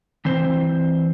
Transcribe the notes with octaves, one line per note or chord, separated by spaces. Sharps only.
E3 C4 C5